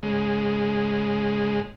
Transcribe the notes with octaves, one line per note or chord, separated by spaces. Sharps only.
G#2 C#3 G#3